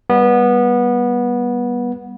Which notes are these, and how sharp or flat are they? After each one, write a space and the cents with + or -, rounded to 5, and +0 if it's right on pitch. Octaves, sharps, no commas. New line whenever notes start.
G3 +10 B3 -20